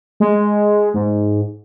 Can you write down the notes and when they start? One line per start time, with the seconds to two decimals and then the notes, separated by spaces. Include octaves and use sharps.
0.20 G#3
0.94 G#2